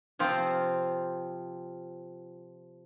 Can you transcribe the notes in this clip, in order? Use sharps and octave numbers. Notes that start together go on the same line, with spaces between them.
C3 F3 C4 F4